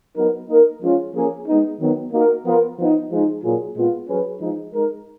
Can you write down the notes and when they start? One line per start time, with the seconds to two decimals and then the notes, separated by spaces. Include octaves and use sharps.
0.16 F#3 B3 D#4 A#4
0.48 A#3 D#4 A#4
0.81 F3 G#3 C#4 F4
1.14 F3 A#3 C#4 G#4
1.46 G#3 B3 D#4
1.79 D#3 F#3 B3
2.11 A#3 D#4 F#4 A#4
2.45 F3 B3 F4 A#4
2.78 F3 B3 D#4
3.10 F3 G#3 D#4
3.43 A#2 F#3 A#3 F4 G#4
3.75 A#2 G#3 B3 F4
4.08 F#3 C#4 G#4 B4
4.40 F3 G#3 D#4
4.73 G#3 D#4 A#4